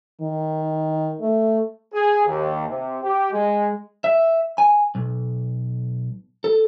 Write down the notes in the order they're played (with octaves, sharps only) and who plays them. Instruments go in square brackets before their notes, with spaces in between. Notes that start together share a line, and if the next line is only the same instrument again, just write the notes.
[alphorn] D#3
A3
[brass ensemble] G#4
D#2
C3
G4
G#3
[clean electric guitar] E5
G#5
B1
A4